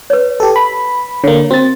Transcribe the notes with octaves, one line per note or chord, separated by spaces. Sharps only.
B4 C#5
G4 A4 A5
B5
D3 A#3 C#5
C4 F#4 A6